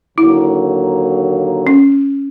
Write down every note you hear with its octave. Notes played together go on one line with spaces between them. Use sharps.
D#2 D3 F#3 A#3 E4
C#4